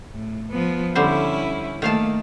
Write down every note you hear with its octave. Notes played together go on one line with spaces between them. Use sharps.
A2
F3 B3
D3 G3 C#4 E4 C5
D#3 A3 A#3 F5 A5